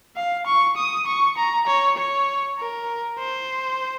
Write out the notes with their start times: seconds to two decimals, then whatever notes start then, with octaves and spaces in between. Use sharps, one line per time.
0.16 F5
0.46 C#6
0.77 D#6
1.07 C#6
1.37 A#5
1.67 C#5
1.97 C#5
2.58 A#4
3.19 C5